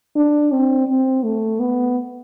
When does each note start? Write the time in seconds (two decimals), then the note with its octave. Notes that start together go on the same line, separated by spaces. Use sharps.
0.16 D4
0.52 C4
0.87 C4
1.23 A3
1.60 B3